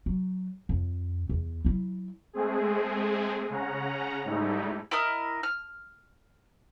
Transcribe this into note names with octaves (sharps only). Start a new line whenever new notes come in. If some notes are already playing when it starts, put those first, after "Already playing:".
F#3
F2
E2
F#3 E4
G#3 A3 C4 G#4
C#3 C#4 F#5 A#5
G#2 G3 A3 D#4 E4
E4 A#4 D#5 F6
F6